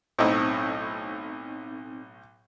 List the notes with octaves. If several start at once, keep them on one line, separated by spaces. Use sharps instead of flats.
B1 A2 C4 D#4